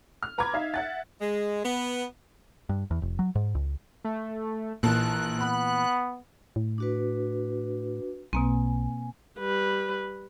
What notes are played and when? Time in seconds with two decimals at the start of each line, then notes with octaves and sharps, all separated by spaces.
0.23 F6
0.38 B4 A#5 B5 D6 G#6
0.53 D#4 E5 F5
0.74 E5 F#5 A6
1.20 G#3
1.64 B3
2.69 G2
2.91 E2
3.02 F1
3.19 F#3
3.35 G#2
3.55 C#2
4.04 A3
4.83 A#1 A#2 E3 A#3 A5 F#6
5.41 B3 B5
6.56 A2
6.78 D4 F#4 B4
8.33 B1 B2 A#3 C4 G#5
9.39 G3 B4